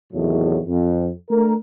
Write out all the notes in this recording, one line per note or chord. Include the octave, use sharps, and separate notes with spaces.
E2 A2 C3 D#3 F#3
F2
A3 D4 A#4